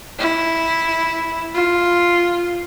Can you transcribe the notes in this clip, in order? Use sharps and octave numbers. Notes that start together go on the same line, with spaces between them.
E4
F4